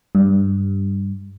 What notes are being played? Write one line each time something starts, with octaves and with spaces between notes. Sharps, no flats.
G2